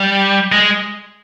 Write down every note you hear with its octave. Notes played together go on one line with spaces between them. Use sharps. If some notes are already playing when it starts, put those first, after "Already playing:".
Already playing: G3
G#3